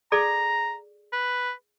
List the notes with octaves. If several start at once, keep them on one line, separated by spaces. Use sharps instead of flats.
G#4 A4 D5 A#5
B4